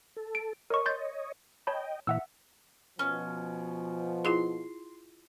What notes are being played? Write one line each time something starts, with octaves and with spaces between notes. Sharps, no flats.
A4
D7
A#4 C#5 D#5 C#6
C6 G6 A6
C#5 D#5 G5 A5 B5
A#2 E3 E5 F#5 E6
B2 F3 C#4
E4 F4 G#4 C6